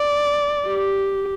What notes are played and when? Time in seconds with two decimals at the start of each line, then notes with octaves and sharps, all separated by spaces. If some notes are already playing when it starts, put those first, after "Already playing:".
Already playing: D5
0.66 G4